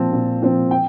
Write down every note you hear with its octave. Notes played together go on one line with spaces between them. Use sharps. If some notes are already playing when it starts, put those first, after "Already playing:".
Already playing: A#2 F3 C4 A5
A#2
F3 C4
G5